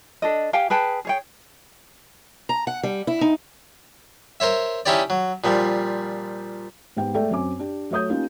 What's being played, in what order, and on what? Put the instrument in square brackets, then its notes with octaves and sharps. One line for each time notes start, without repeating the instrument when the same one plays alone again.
[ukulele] D4 A4 D#5
G4 F5 G5 G#5
G#4 B4 G5 A5
G#4 C#5 G5
[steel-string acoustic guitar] A#5
F#5
G3
E4
D#4
[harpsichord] A#4 C5 C#5 E5
C#4 D#4 E4 G4 C#5 D5
F#3
A#2 F3 G3
[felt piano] G#2 B3 G4 G5
G#3 A3 A4 D5 E5 G5
F#2 C4 C#4 G#5 D6
D4 G4
F#3 A3 C#5 D#6 G6
A#3 C#4 D#4 F4 G4